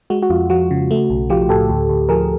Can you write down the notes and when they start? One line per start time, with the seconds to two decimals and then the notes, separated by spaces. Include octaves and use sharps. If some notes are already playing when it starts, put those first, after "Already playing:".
0.10 G#3 F#4
0.22 F#4
0.30 F2 F4
0.50 F3 F#4
0.71 C#3
0.91 A3
1.10 B1
1.30 F3 F4 G4
1.49 A2 G4 A4
1.69 D2
1.89 D2
2.09 F3 G#4 A#4